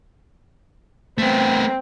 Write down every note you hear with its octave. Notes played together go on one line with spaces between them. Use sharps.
A3 B3 C4